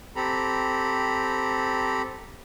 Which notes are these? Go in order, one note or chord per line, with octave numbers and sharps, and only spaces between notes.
C4 G4 A4 A#5 B5